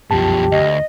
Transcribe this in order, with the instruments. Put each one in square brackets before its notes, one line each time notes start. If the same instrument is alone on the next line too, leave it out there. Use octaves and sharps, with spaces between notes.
[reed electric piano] C2 F#2 A5 [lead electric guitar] B2 F3 [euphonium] G4
[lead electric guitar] D2 [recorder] D#5